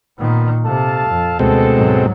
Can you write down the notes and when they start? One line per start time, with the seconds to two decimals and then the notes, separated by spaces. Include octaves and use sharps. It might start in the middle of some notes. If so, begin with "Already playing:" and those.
0.19 A#2 D#3 B3 C4
0.65 C3 A4 F5 A5
1.10 F2
1.39 D2 B2 G#3 C4 A4
1.75 G#2 F#3